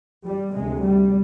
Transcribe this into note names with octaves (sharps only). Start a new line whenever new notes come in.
G3
D2 C3 G#3
G3